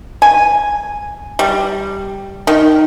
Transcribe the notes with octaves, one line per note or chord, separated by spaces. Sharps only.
G#5
G3
D#3